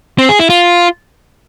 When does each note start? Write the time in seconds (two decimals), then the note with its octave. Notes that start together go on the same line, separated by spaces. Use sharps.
0.19 C4
0.29 G#4
0.39 E4
0.50 F4